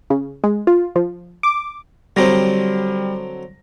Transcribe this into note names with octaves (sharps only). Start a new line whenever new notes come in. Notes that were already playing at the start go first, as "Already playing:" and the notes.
C#3
G#3
F4
F3
D6
D3 F#3 G3 C4 A#6